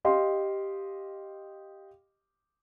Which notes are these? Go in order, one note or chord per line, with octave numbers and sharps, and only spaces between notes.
G4 D#5 F5 C6